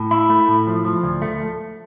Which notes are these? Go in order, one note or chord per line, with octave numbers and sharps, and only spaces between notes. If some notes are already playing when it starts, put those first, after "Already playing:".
Already playing: A2
E4
A3
A2
F3
F3
D2
A3